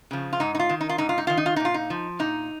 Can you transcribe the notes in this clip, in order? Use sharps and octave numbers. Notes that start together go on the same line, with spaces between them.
C#3 F3
F4
G#2 D#4
D#4
F4
D#3
D#4
F4
G#2 D#4
F4
D#4
D#3 F4
D#4
F4
A#2 D#4
F4
D#4
F3
A#2 D#4